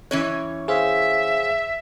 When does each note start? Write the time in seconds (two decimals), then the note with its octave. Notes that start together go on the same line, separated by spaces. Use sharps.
0.11 E3 C#4 C#5
0.68 G#4 C5 E5 F5